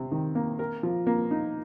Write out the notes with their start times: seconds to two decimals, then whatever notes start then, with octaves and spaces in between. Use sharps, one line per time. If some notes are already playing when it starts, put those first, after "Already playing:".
Already playing: C3 C4
0.12 D#3
0.35 A#3
0.59 A#4
0.83 F3
1.07 A#3
1.31 D#4